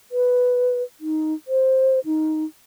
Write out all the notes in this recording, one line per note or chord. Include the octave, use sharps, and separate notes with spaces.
B4
D#4
C5
D#4